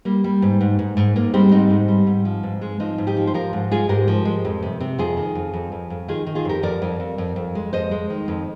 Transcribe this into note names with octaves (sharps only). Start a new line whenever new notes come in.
G3 A#3
G3
G#2
G#2
G#2
G#2
G#2 A#3
G3 G#3 C4
G#2 C4 D#4
G#2
G3
G#2
F3
G#2
G#3
F3 C4 D#4
G#2
D#4 G4
F3
C5
F3 G4 A#4
G#2
G#3 F4 G#4
G#2 G4 A#4
F3
G#3
F2
C3
C3
F2 F4 G#4
D#3
F2
F2
F2
F2
D#3 F4 G#4
D#3
F4 G#4
F2 G4 A#4
F2 A#4 D5
F2
F2
F2
F2
G#3
F2 C5 D#5
G#3
D#3
F2